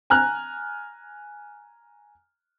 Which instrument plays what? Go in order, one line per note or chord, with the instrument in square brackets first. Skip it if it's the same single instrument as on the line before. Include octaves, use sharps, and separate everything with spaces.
[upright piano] G#5 A#5 F6 F#6